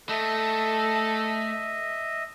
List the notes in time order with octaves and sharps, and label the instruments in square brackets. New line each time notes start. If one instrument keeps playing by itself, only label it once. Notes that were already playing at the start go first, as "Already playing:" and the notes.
[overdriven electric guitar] A3 [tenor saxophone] A4 [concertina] D#5 E5